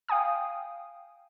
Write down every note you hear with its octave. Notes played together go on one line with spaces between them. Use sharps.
F5 G5 G#5 D#6